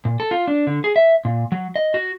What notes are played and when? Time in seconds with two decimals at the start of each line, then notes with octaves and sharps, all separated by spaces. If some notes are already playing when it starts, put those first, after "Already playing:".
0.05 A#2
0.20 A4
0.31 F4
0.48 D4
0.67 D3
0.84 G#4
0.96 E5
1.25 A#2
1.52 F#3
1.76 D#5
1.94 F#4